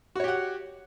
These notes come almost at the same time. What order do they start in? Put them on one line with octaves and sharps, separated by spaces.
F#4 C#5 G4 F#5